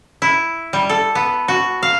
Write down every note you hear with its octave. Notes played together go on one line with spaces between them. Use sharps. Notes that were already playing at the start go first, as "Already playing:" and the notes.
E4
G3
A4
B3
F#4
F5